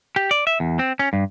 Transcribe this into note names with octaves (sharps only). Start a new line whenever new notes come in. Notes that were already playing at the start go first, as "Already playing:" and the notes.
G4
D5
E5
E2
C4
C#4
G2